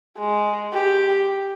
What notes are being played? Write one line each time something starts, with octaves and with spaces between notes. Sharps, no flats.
G#3
G4